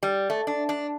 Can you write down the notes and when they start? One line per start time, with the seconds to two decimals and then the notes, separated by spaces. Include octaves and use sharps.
0.03 G3
0.30 A3
0.47 D4
0.69 D4